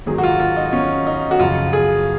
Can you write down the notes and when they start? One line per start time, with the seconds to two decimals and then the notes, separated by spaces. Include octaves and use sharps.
0.06 G#2 D#3 F#3 G#4
0.18 F#4
0.23 F4
0.40 F4
0.56 D#4
0.73 C#4
1.07 D#4
1.31 F#4
1.39 F#2 C#3 F3 F4
1.73 G#4